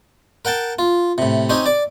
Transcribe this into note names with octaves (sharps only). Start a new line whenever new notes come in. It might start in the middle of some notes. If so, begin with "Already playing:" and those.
A#4 F#5 G5 A5
F4
A2 C3
C4 C#4 D#4 G4
D5 D6